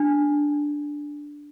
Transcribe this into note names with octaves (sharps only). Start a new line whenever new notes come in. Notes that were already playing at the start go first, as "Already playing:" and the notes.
Already playing: D4